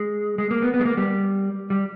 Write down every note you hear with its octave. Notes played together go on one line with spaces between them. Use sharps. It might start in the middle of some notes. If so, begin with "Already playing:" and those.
Already playing: G#3
G#3
A#3
B3
B3
G#3
A#3
G3
G3